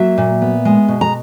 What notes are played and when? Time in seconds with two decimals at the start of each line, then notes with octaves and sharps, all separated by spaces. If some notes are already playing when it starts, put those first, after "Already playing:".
Already playing: F#3 A#3 E5
0.18 A#2
0.42 B3
0.65 G#3
0.88 B2
1.01 A#5